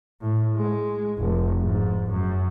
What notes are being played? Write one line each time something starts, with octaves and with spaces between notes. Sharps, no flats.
A2
G#3
F1
G#2
F#2